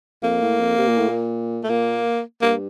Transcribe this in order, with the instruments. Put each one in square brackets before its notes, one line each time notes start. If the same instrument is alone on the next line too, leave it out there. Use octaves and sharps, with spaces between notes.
[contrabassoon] F2 [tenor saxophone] A#3
[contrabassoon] A2
F2
C3
A#2
A2
A#2
[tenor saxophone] A3
[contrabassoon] A#2 [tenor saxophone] A#3
[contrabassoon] G2 [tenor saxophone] A#3